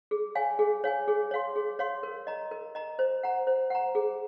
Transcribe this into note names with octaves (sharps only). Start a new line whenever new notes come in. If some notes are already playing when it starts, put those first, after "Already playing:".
G#4
C#5 F5 G#5
G#4
C#5 F5 G#5
G#4
C#5 F5 C6
G#4
C#5 F5 C6
A#4
D#5 A#5
A#4
D#5 A#5
C5
F#5 A#5
C5
F#5 A#5
G#4